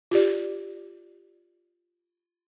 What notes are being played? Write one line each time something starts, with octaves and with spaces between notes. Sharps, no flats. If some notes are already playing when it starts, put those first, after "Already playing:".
F4 G4 D5